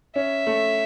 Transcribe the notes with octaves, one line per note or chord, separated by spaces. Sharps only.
C#4 E5
A3